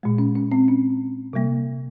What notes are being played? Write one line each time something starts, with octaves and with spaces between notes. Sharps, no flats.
A#2 G#3
C#4
C#4
C4
C#4
C3 G3 A#3